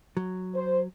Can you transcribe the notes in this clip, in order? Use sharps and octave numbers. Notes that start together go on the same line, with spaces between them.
F#3
C5